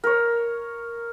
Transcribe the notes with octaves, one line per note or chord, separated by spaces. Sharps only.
A#4 C#5